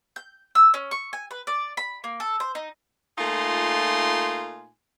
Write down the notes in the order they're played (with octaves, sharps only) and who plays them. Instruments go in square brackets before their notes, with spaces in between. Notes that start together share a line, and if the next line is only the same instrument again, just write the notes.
[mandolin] G6
E6
C#4
C#6
G#5
B4
D5
B5
A#3
A4
C5
D#4
[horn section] A#2 A3 D#4 F4 G#5 C6